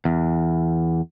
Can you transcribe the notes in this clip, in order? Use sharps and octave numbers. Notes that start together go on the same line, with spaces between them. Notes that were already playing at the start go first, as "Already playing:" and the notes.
E2